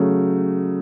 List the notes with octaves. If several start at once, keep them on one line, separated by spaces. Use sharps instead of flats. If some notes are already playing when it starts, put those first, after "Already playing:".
Already playing: C#3 F#3 A3